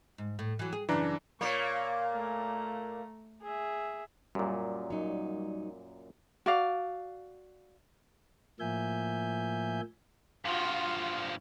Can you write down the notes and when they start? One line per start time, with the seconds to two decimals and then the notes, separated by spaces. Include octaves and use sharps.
0.18 G#2
0.39 A2
0.59 E3 F#3
0.73 G#4
0.89 F#2 C#3 E3 D4 A#5
1.41 A#2 A#3 C#5 C#6
2.10 A3 A#5
3.42 G#4 E5
4.35 F#2 A#2 G3 D5
4.90 F#3 D#4
6.46 F#4 D5 F5
8.60 A2 F3 A#3 E5 G#5 G6
10.45 G2 F3 F4 F#4